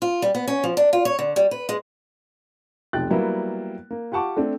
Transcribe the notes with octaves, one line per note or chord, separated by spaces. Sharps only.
F4
G3
B3
C#4
F3
D4
F4
C#5
D3
G3
B4
G#3
F1 B1 G4 G5 F#6 A6
F#3 G3 A#3 B3 E4
A#3
F4 G4 F#5 A5 C#6 D6
A3 C4 D4